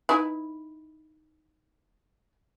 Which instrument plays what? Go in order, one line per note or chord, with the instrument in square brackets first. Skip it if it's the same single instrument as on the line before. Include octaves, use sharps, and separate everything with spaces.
[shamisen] D#4 E4 B4